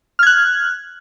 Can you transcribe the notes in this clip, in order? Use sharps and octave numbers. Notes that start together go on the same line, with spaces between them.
F6 F#6 G#6